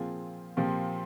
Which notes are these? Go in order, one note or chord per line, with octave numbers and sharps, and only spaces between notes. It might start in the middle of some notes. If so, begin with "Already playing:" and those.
Already playing: A#2 F3 C4 F4 G#4
A#2 F3 C4 G4